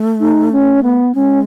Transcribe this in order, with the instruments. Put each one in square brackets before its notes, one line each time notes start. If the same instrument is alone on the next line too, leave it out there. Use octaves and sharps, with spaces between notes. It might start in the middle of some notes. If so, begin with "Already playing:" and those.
Already playing: [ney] A3
[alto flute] D#4
C#4
B3
[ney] G#3 [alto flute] C#4